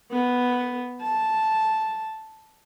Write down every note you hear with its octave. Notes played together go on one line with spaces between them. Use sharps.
B3
A5